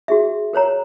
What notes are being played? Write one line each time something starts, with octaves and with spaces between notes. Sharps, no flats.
F#4 G#4 E5
A#4 C5 C#5 A#5